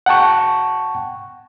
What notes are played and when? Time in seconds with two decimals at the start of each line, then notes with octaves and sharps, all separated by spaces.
0.06 F#5 G5 A5 C#6